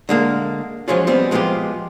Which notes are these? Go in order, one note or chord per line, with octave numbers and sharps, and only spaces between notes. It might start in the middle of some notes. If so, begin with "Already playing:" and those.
D3 G#3 A#3
F3 F#3 G#3 C#4 F4
G3 B3 C4
F3 G#3 B3 E4 F4 G4